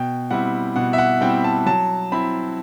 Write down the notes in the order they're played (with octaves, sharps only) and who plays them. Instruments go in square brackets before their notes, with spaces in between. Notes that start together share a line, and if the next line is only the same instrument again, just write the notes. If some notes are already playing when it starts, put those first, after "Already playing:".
Already playing: [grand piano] B2 G5
G3 C4 E4 F#5
B2 F#5
E5
F#5
G3 C4 E4 G5
A5
F#3 A5
C4 E4 B5